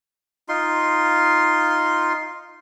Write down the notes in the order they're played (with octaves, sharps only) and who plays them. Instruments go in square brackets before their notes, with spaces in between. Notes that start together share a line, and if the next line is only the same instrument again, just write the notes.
[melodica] D#4 F4 C6